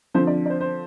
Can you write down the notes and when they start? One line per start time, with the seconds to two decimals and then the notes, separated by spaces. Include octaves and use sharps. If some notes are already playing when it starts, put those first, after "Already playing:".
0.14 D3 F3 C4 C5
0.27 D5
0.46 D5
0.50 C5
0.61 C5